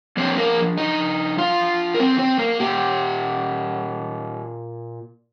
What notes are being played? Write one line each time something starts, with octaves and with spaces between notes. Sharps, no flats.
F3 A#3 C4 D4 C5
A#3 A#4
D#4 D#5
F4 F5
A#4
C4 C5
C4 C5
A#3 A#4
A#2 G4